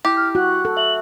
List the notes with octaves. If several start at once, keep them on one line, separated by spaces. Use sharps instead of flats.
E4 G4
F6
F#4 F#6
A4 F#6
E5 F#7